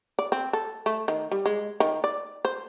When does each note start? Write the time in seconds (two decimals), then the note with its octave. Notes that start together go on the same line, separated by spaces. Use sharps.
0.19 D5
0.32 C4
0.53 A4
0.86 A3
1.08 D#3
1.32 G3
1.46 G#3
1.80 D#3
2.04 D5
2.45 C5